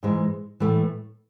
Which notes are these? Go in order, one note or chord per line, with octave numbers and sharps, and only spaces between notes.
G#2 E3 G#3
A2 E3 A3